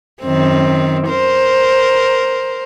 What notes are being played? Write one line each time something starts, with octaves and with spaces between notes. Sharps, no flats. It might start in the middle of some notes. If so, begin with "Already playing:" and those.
F#2 D#3 C4
A#4 C5